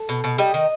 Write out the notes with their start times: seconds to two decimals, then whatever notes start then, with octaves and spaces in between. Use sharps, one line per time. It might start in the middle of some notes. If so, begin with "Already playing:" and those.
Already playing: A4
0.09 B2
0.24 B2
0.38 G3 D#5
0.54 D#3